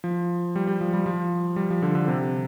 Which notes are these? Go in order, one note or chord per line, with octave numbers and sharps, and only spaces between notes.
F3
G3
G3
F3
G3
F3
G3
F3
D3
D3
C3